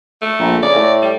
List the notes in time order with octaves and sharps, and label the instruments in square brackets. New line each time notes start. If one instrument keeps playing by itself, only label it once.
[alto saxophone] A3
[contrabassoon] A#1
[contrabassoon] C#3 [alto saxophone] D5
[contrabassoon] A2
[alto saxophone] G3